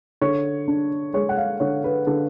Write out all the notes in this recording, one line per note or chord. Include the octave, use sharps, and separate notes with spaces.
D3 C#5
D4
G#3 C#5
F#5
F5
D3 C#5
B4
D3 A4